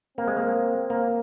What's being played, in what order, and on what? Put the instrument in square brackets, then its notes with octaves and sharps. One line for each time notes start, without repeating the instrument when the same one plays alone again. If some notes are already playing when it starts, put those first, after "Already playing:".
[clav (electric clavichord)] A#3 [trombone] C4
[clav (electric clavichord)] G#3
A#3
A#3